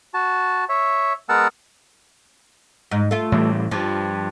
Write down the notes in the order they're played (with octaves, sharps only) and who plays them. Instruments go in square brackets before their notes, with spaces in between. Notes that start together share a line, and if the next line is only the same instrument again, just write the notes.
[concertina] F#4 A5
C#5 E5
G#3 B3 A#4 F#5 A5 E6
[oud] G#2
A3 F4
[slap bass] A2 E3 G3
[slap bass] G2 [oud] F3